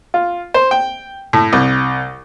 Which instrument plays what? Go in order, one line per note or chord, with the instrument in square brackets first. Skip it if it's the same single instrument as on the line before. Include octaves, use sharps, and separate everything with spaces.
[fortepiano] F4
C5
G5
A2
C2